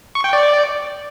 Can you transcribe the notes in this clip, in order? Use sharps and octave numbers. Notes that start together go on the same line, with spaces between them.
C#6
G5
D5